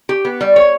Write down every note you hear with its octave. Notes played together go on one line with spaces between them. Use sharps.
G4
B3
G3
C#5